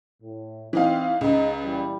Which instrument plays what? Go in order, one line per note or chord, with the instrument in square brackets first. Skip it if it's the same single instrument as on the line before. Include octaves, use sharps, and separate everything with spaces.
[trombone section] A2
[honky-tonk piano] E3 D#4 F5 [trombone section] C4
[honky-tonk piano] C#2 C#3 [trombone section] G#3 D#4
[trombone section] A#2 E3 G3